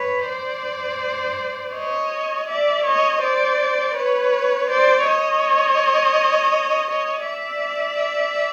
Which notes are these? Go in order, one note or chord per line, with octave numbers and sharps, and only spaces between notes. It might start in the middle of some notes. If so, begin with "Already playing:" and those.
Already playing: B4 C#5
C5 D5
C#5 D#5
D5 E5
C#5 D#5
C5 D5
B4 C#5
C5 D5
C#5 D#5
C#5 D#5
D5 E5